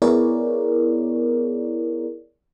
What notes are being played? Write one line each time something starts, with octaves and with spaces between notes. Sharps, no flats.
B3 E4 G#4 A#4 C#5 D5